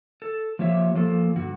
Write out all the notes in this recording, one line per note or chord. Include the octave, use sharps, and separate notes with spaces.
A4
F3 A#3 G4 C#5 E5
F3 A#3 A4
G2 D3 F#4